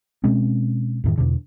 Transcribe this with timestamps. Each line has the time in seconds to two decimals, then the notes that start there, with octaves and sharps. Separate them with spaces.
0.24 B2 G#3 C4 C#4
1.04 F2 A2 D#3
1.18 E2 B2 D3